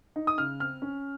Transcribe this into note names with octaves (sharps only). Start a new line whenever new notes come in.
D#4
D#6
C#3 F6
C4 F6
C#4